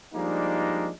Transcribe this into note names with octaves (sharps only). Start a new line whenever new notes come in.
F3 G3 G#3 A#3 D4 D#4